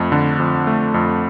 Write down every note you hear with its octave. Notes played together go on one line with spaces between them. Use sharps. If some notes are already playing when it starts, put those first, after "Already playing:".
Already playing: F2 A3
D3
F2
A3
F2